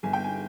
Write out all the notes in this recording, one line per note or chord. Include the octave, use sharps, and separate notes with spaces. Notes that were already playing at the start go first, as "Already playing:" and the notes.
G1 G#5
G5
G#5